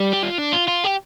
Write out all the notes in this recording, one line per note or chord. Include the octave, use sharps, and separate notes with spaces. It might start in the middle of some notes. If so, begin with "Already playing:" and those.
Already playing: G3
G4
F4
D4
F4
F4
G4